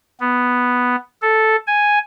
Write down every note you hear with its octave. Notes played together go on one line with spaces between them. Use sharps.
B3
A4
G#5